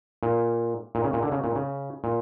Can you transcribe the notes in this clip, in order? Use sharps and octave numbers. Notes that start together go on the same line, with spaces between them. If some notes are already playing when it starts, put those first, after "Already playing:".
A#2
A#2
C#3
A#2
D3
C#3
A#2
C#3
A#2